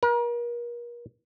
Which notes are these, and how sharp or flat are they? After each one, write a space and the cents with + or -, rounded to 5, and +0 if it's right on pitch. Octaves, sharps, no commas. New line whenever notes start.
A#4 +40